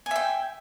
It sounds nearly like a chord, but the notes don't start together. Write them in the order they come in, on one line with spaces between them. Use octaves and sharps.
G#5 E5 G5